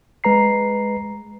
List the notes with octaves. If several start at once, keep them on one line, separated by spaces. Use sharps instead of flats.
G#3 B4 A#5 C7